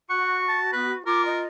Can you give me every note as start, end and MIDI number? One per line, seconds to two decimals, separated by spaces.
0.10 1.03 66
0.10 0.40 78
0.10 0.60 85
0.48 0.71 81
0.73 0.93 59
0.73 0.93 71
1.06 1.47 65
1.06 1.42 70
1.06 1.25 86
1.26 1.48 75